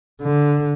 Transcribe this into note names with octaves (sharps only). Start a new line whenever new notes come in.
D3